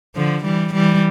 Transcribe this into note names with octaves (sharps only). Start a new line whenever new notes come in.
D3 F3
E3 G3
E3 G3